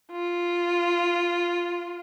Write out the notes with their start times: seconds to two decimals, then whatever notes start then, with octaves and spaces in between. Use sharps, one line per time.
0.11 F4